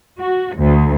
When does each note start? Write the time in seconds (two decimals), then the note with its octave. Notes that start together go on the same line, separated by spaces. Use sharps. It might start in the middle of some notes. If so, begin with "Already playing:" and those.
0.18 F#4
0.56 D2